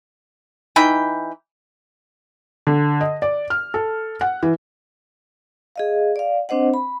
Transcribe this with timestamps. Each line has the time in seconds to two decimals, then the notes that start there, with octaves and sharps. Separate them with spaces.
0.76 E3 D#4 G5 B5
2.67 D3
3.01 D#5
3.22 D5
3.50 F6
3.74 A4
4.21 F#5
4.43 E3
5.76 G#4 D#5 F5
6.16 D5 F5
6.49 C4 D4 C5 D#5 F#5
6.74 B5